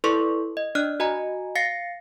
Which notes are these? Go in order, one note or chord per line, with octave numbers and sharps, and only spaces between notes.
E4 A4 B4 D5 C6 C#6
D#5
D4 D5 F6 F#6
F#4 D#5 G#5 A#5
F5 A6 A#6 C7 C#7